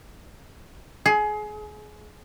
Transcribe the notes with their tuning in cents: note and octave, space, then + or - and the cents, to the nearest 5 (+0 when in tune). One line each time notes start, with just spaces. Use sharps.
G#4 +25